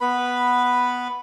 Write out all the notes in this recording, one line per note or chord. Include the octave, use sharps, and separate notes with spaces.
B3 B4 B5